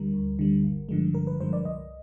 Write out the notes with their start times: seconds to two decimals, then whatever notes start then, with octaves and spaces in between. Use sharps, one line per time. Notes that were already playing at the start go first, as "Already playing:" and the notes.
Already playing: D2 D3 G3 A#4
0.14 D2
0.39 D3 G3
0.64 G1
0.89 G2 D3 F3 G#3
1.14 G1 A#4
1.27 B4
1.40 G2 D3 F3 G#3 C5
1.53 D5
1.65 C2 D#5